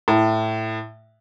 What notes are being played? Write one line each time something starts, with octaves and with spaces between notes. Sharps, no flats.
A2